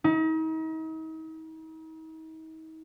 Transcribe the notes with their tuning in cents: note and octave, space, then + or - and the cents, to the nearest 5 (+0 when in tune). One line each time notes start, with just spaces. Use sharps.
D#4 +40